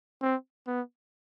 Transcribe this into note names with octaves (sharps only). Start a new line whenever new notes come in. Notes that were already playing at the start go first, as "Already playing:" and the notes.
C4
B3